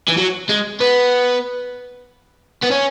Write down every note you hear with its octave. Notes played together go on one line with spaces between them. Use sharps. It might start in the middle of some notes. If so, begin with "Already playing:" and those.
E3
F#3
G#3
B3
B3
C#4